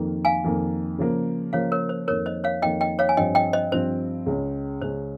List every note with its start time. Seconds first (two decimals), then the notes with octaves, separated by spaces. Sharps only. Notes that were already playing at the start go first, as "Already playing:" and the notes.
Already playing: F2 D#3 A#3
0.25 F5 G#5
0.44 F2 D#3 A#3
0.98 C#3 F3 A#3
1.53 C#3 F3 A#3 C#5 F5
1.72 A#4 C#5
1.89 C5
2.08 F2 D#3 A#3 A#4 C#5
2.26 C5 D#5
2.44 C#5 F5
2.62 F2 D#3 A#3 D#5 G5
2.81 D#5 G5
2.99 C#5 F5
3.09 G#5
3.17 G2 F3 C4 D#5 G5
3.35 D#5 G5
3.53 C5 D#5
3.72 G2 F3 C4 C5
4.26 C#2 C#3 G#3 C#4
4.82 C#2 C#3 G#3 C#4 C5